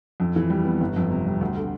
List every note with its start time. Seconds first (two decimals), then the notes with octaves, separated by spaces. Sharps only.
0.20 F2
0.36 E3
0.50 G3
0.65 B3
0.81 G1
0.96 F2
1.11 C3
1.26 G3
1.41 D2
1.57 D3